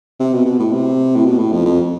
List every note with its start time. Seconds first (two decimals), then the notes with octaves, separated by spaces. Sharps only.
0.20 C3
0.33 B2
0.46 B2
0.60 A2
0.73 C3
1.16 A2
1.26 B2
1.39 A2
1.52 F2
1.66 F2